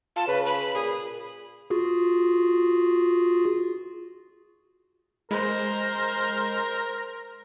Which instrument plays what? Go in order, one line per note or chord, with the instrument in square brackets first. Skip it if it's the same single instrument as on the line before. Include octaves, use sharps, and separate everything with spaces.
[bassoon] F4 [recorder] A5
[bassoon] C#3 [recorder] B4
[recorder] B5
[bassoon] A#2 [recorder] G#4
[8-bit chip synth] F4 F#4 G#4
[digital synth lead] G#3 [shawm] A#4 [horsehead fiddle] C5